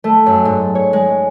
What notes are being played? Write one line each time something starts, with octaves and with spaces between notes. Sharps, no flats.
A3
F#2
G#2
C#5
G#3